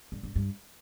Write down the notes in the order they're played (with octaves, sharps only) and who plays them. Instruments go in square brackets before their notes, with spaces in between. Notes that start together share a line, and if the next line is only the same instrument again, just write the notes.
[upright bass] G2
G2
G2